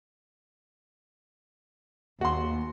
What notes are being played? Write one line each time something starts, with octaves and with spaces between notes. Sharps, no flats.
D#2 F#4 C6